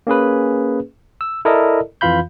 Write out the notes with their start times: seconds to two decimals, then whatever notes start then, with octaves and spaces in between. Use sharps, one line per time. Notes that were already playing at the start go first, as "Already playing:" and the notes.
0.07 A#3 C#4 G#4 B4
1.21 E6
1.45 E4 A4 A#4 D5 D#5
2.01 F2 E3 F4 F5 B5 G6